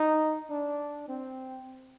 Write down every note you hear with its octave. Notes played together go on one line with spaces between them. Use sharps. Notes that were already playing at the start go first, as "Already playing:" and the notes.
Already playing: D#4
D4
C4